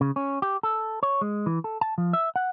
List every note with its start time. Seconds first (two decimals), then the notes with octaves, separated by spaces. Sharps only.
0.01 C#3
0.16 C#4
0.42 G4
0.63 A4
1.03 C#5
1.21 G#3
1.46 E3
1.64 A4
1.81 A5
1.98 F3
2.13 E5
2.36 F#5